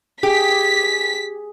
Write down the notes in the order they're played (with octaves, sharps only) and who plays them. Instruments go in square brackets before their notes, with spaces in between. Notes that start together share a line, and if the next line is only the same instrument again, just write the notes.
[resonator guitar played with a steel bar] G4 [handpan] G#4 [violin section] B6